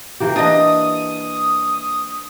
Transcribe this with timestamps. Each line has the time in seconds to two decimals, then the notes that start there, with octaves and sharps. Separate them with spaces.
0.20 E3 A#3 G4
0.36 D4 D#5 D#6